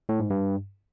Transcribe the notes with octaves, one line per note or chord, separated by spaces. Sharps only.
A2
G#2
G2